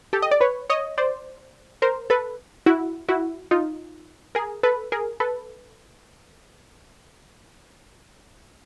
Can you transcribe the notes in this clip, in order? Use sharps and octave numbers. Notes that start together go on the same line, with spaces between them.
G4 A4
D#5
D5
B4 C#5
C#5 D#5
C5 D5
A#4 C5
A4 B4
E4 F#4
E4 F#4
D#4 F4
G#4 A#4
A4 B4
G#4 A#4
A4 B4